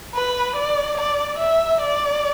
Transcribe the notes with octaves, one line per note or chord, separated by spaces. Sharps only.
B4
D5
D5
E5
D5